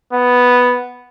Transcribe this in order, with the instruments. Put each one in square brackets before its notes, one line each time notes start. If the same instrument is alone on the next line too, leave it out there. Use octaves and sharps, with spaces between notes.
[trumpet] B3